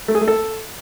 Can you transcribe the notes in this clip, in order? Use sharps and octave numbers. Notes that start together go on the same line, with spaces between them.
A3
G#4
A3
A4